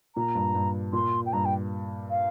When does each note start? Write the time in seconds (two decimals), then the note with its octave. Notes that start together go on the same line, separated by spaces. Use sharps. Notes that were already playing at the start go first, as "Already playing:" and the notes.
0.15 A#2 A#5
0.35 G2
0.55 G2
0.93 A#2 C6
1.26 G5
1.33 G2 A#5
1.45 G5
2.10 F5